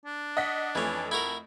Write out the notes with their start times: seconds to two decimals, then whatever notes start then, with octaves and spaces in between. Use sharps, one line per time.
0.06 D4
0.37 D#5 F#5 B6
0.75 F2 E3 A3 C#4
1.12 E4 F#4 A#4